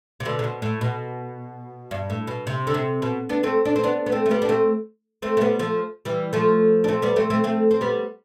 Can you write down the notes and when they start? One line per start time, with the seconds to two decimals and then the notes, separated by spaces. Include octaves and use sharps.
0.20 C3
0.25 B2 D3
0.39 C3
0.44 B2
0.62 A2
0.81 B2
1.91 G2
2.10 A2
2.27 B2
2.47 C3
2.67 D3
2.74 C3
3.02 B2
3.29 B3 D4
3.43 A3 C4
3.65 D4
3.76 C4
3.83 B3 D4
4.06 B3
4.12 A3 C4
4.26 A3
4.31 G3 B3
4.42 D4
4.49 A3 C4
5.22 A3 C4
5.37 A3
5.41 G3 B3
5.59 F3 A3
6.05 E3 G3
6.33 F3 A3
6.84 D4
6.88 A3 C4
7.02 G3 B3
7.16 A3 C4
7.30 A3 C4
7.44 A3 C4
7.71 C4
7.81 G3 B3